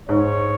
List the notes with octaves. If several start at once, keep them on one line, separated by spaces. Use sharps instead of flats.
G#2 C#5